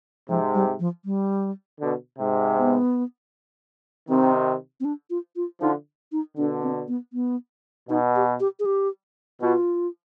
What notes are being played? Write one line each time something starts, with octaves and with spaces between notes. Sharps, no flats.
G#2 C3 F3
G3
F3
G3
B2 D3
G#2 C3
B3
C3 D#3 C4
C4
D4
F4
F4
D3 F3 D#4
D#4
B2 D3 D4
C4
B3
B3
B2 D#4
G4
G4
G#4
G4
B2 F4